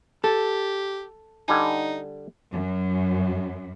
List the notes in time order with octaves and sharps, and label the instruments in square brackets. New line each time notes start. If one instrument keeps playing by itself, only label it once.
[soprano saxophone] G4 [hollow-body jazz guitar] A4
[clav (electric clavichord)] D3 G3 G#5 [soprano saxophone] D#4
[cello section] F#2